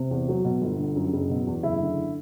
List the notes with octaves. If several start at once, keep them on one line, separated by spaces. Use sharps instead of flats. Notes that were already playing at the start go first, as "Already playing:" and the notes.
Already playing: C3
E2
F#3
B2
G1
D3
F#2
F#1
B2
E2
F#1 E4
D3